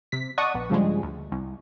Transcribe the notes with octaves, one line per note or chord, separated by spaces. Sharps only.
C3 B6
D5 D#5 F#5 A5 C#6 D#6
A#1 B3
G2 C#3 F3 G3 G#3
D2
C2